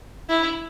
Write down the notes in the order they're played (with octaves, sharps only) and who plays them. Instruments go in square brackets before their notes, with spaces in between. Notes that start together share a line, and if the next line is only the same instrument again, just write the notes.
[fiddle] E4